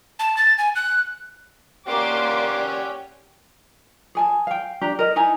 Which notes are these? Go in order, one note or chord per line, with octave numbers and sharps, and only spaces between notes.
A5
A6
G#5
F#6
A#3 C#4 G4 D5 F#5 C6 D6
G#4 G#5 A5
F5 G5
D4 G4 A#5
A#4 D#5
D#4 E4 G#5 A#5